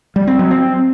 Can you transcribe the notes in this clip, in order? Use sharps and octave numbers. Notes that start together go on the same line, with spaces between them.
G3
C4
F#3
C4